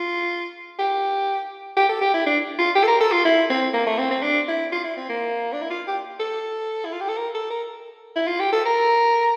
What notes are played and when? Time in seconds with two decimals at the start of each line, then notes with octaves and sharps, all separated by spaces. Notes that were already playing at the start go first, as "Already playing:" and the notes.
Already playing: F4
0.79 G4
1.77 G4
1.89 A4
2.01 G4
2.14 E4
2.26 D4
2.59 F4
2.75 G4
2.83 A4
2.88 A#4
3.01 A4
3.12 F4
3.25 E4
3.50 C4
3.73 A#3
3.87 A3
3.99 C4
4.11 C4
4.22 D4
4.48 E4
4.72 F4
4.84 E4
4.97 C4
5.09 A#3
5.53 D4
5.62 E4
5.70 F4
5.87 G4
6.20 A4
6.85 E4
6.93 F4
7.01 G4
7.09 A4
7.17 A#4
7.35 A4
7.50 A#4
8.16 E4
8.27 F4
8.40 G4
8.53 A4
8.66 A#4